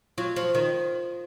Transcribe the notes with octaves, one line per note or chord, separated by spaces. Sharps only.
F#3 F4
F3
D#3